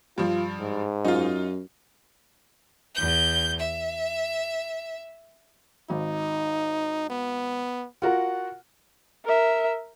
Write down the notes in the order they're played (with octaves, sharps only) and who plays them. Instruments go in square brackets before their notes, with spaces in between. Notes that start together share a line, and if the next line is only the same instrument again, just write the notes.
[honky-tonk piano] G2 F3 [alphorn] F4
[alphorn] G#2
[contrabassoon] F#2 [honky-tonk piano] D#4 F4
[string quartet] E2 G6
E5
[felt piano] G#1 [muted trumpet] D#4
[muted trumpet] B3
[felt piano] F4 F#4 A#4 [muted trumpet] F#5
[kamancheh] A#4 E5